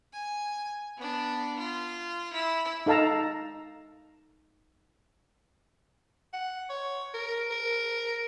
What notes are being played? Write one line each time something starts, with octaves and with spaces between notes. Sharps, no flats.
G#5
B3 D4
F4
E4
D#4 A4 F5 A5 A#5
F#5
C#5
A#4
A#4